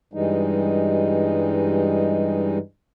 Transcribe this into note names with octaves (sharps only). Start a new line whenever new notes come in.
G2 E3 G3 G#3 D#4